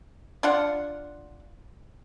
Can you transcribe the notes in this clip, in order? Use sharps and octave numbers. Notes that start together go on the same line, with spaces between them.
D4 F4 F#5